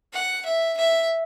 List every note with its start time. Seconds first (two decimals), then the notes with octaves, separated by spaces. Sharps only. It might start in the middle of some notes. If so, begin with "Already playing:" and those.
0.13 F#5
0.46 E5
0.77 E5